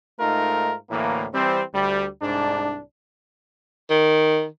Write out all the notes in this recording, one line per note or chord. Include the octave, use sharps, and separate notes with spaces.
G#2 A3 D#4 F4 A#4
D2 A2 E3 A#3
E3 G3 C4
D2 G3
C2 G#2 D4
D#3